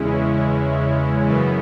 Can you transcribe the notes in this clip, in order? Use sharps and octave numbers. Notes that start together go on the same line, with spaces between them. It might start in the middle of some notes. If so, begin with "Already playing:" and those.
Already playing: E2 C#3 G#3 C#4 E4
F#2 C#3 E3 B3